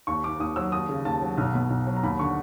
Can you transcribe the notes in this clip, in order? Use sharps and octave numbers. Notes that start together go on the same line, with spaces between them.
D#2 C#6
D#3 D6
D#2 D#6
F#3 E6
D#2 D#6
C#3
D#2 A5
F#3
B1
B2
B1
F#3
A#5
D#2 B5
D3 C#6